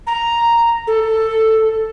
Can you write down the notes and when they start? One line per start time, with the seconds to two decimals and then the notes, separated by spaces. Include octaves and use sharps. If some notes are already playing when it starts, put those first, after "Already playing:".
0.07 A#5
0.87 A4